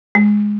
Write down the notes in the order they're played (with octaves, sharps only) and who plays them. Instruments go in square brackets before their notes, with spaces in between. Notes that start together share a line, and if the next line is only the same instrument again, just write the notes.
[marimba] G#3